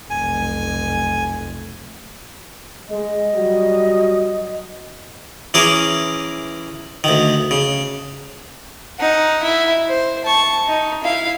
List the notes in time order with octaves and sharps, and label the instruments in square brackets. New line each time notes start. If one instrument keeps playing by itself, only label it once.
[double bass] F1 B1 [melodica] G#5
[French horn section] G#3 [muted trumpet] D#5
[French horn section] F#3 G3 F#4
[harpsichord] E3 C#4 G#4 A#4 D6
D2 D#3
C#3
[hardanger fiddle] D#4 F#5
E4
C5
A5 C#6
D#4
E4 F5